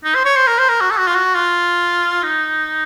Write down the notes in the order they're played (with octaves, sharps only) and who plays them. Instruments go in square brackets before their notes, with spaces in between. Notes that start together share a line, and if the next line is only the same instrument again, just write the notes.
[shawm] D#4
C5
C#5
C5
A#4
C5
A#4
F#4
A4
F#4
F4
F#4
F4
D#4